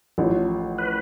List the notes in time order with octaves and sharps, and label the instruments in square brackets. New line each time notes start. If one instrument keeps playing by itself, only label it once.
[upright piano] A1 A2 F3
[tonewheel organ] B4